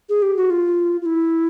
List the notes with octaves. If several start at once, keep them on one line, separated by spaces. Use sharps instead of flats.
G#4
G4
F#4
F4
F4
E4